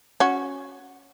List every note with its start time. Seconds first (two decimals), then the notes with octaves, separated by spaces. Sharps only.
0.20 C#4 F#4